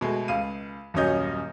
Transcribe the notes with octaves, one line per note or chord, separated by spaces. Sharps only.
B2 G#3 A3
C#2 F5 D#7
D#1 F#2 F#3 C#4 D#5 G6